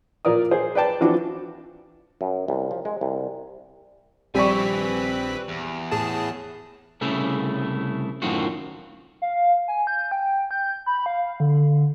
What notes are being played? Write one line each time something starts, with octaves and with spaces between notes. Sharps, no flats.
A#2 A#4 D5 D#6
G#4 C5
B4 D5 G5 A5
E3 F3 C4 D4 F#4 D6
F#2
C2
F3
G#3
C2
A#1 G3 C4 B4 D5 G#5 C#6 B6
E2
A2 G#4 A5
C2 C#3 A3 E4
F#2 A2 D#3 C4 F4 F#4
F5
G#5
G6
G5
G6
B5
F5
D3